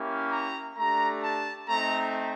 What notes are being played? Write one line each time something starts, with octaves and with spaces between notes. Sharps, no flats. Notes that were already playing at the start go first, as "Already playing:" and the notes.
Already playing: A#3 C#4 E4 G4
A#5
A3 D4 G4 A#5
A5
A3 C4 D#4 A#5